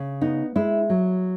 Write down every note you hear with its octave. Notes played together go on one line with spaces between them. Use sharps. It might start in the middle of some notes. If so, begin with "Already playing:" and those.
Already playing: C#3
B3 D#4
G#3 E4
F#3